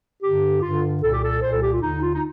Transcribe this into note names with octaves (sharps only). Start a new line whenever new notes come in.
G2 D3 G4
G2 D3 F4
C2 A#2 A4
G4
A4
C2 A#2 C5
A4
G4
F4
D#2 D3 D#4
F4
D#4